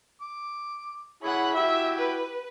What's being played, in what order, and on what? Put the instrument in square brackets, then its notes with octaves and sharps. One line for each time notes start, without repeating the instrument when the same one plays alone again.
[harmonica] D6
[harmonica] E4 G#4 C#5 [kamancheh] F#5 B5
[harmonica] E4 F#4 G4 [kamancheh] E5
[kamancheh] B4